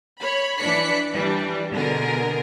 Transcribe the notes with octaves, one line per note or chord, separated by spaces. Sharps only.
C#5 B5
E3 D4 B5 B6 C#7
E3 G3 D4
B2 D3 G#4 A#4